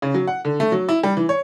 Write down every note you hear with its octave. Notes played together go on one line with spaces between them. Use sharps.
C#3
F#3
F#5
D3
A3
F#3
E4
G3
E3
C#5